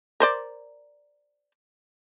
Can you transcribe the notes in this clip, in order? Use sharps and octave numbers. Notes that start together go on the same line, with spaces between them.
A#4 C5 D5